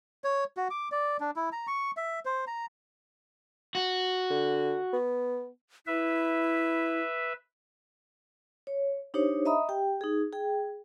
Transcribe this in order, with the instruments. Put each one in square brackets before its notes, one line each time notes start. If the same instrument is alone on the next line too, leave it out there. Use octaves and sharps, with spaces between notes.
[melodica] C#5
F#4
D6
D5
D4
E4
A#5
C#6
E5
C5
A#5
[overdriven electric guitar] F#4
[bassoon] D3
B3
[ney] E4 [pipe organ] B4 E5
[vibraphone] C#5
D4 D#4 G4 C5 C#5
D#5 E5 A#5 B5 D#6
G4 G5
D#4 G#4
G#4 G5